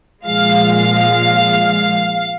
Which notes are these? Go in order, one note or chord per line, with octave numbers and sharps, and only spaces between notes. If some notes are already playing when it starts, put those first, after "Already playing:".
A#2 F3 G#3 F5
F5